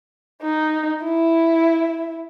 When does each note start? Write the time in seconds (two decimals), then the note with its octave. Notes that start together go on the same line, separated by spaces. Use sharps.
0.42 D#4
1.04 E4